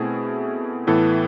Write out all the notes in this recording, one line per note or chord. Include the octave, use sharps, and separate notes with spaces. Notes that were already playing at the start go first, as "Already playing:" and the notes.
Already playing: B2 A3 C4 E4 G#4
A2 E3 B3 E4 A4